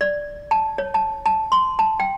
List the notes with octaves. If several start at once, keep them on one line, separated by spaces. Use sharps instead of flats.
D5
A5
C#5
A5
A5
C6
A5
G5